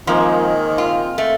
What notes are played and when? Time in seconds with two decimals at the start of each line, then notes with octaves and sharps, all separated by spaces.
0.07 D#3 F3 G#3 A#3 C4
0.78 F4
1.18 A3